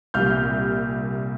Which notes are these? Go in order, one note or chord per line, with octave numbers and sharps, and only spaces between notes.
C2 A#2 G3 F6 G6